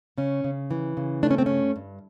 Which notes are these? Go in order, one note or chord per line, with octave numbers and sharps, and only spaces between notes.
C#3 C#4
C#3
E3
C#3
A3 D4
C#4
C4
G2 C#4
G2